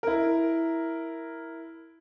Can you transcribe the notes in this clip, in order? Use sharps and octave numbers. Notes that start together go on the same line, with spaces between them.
E4 A#4